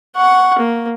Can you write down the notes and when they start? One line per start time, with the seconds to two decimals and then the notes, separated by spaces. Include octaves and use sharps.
0.16 F#5 C#6
0.59 A#3